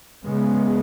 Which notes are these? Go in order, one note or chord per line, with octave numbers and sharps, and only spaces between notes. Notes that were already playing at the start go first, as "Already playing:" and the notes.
C#3 G#3 B3